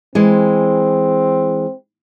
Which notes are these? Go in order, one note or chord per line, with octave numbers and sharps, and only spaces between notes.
E3 G#3 C4